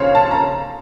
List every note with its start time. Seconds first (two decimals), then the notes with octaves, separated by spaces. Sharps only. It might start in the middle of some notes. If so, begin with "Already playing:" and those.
Already playing: D#2 C#3 F3 C4 C5 C#5 F5
0.15 A5
0.31 A#5